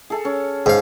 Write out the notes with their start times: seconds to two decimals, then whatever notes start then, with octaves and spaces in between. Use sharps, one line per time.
0.10 G#4 A4 G#5
0.25 C#4
0.66 G#2 F5 G#5